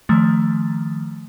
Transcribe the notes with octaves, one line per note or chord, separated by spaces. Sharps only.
D#3 F3 A3